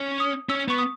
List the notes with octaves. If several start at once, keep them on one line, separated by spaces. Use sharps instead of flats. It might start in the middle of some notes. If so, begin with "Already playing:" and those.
Already playing: C#4
D#6
C#4 E6
B3 C#6
D#6